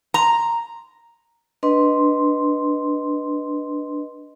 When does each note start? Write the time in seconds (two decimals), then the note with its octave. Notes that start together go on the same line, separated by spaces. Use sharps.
0.14 A#5
1.63 D4 B4 D#5 C6